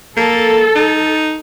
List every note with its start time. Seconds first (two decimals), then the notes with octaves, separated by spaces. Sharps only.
0.17 A#3 A4
0.75 D#4